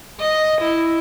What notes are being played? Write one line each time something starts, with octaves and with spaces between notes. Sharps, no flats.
D#5
E4